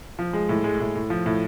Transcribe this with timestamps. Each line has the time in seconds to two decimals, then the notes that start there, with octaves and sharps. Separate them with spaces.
0.19 F3
0.33 G#3
0.49 A2
0.64 G#3
0.80 A2
0.95 A2
1.10 F3
1.26 A2